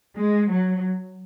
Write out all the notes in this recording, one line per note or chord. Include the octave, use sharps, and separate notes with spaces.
G#3
F#3